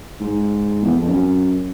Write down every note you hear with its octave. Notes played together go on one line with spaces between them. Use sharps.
G#2
E2
F2
F#2